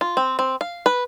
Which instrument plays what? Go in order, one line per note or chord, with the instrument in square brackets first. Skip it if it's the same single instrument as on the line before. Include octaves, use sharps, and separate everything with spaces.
[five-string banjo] F4
C4
C4
F5
B4